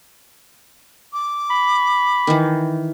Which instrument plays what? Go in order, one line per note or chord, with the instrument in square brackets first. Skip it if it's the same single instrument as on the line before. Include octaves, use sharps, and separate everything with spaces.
[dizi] D6
[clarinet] B5
[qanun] D#3 E3